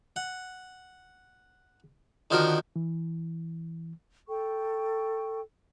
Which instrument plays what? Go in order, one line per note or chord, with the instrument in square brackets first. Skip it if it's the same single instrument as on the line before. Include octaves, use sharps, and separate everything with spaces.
[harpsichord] F#5
D3 D#3 F3 F4 F#4 A#4
[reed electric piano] E3
[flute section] A4 G5 C#6